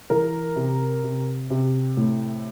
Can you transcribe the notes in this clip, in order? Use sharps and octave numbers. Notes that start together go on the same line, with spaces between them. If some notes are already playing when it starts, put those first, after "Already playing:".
E3 A#4
C3
C3
C3
A2